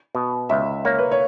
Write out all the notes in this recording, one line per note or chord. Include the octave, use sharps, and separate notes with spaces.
B2
C#2 E5
A#3 C#5
B4
C#5